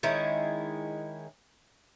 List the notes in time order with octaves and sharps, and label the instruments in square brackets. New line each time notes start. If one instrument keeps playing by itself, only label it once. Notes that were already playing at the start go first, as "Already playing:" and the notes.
[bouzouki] D#3 G#3 C#4 E4